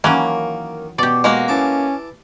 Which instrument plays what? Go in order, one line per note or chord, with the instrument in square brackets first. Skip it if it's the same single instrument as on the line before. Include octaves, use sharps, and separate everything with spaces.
[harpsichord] D#3 [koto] E3 F#3 C#4 [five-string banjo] A#3
[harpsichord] B2 [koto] G4 D5
[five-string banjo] G#3 A#3 F#4
[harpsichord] E3 A5 D6 [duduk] C#4